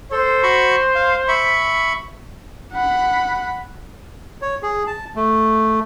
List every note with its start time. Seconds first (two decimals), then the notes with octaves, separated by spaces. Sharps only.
0.12 A4 C5
0.43 F#4 B5 C#6
0.95 F5
1.28 E5 B5 C#6
2.73 F#5 B5
4.42 C#5
4.63 G#4
4.87 A5
5.16 A3